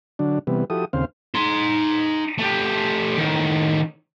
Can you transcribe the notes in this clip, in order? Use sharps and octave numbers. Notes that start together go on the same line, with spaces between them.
D3 F#3 D4
C3 E3 G3 B3
F3 E4 F#4 G4 A4 D#6
D#2 C#3 C4 C5 F5
D#4 C6
A3 G4
A2 D#3